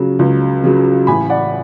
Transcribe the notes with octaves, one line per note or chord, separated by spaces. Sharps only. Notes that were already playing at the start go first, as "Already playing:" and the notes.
Already playing: C#2 C#3 F#3
C#2
C#3 F#3
A1 G#5 B5
D5 F#5